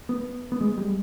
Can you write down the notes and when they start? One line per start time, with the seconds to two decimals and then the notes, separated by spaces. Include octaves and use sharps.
0.09 B3
0.52 B3
0.61 G#3
0.78 G3